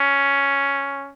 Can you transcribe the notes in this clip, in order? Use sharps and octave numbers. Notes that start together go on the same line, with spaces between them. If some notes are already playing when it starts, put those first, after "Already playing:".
Already playing: C#4